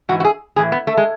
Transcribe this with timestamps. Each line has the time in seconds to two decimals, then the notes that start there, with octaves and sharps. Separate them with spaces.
0.09 G#2 E3 F#4
0.20 F#4
0.25 G#4
0.56 A2 E3 G#4
0.72 B3
0.87 A3
0.97 G#3